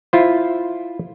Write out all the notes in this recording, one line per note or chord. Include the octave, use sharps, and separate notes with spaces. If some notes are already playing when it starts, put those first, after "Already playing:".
E4 F4 C5